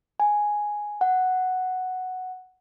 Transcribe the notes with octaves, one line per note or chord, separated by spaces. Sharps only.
G#5
F#5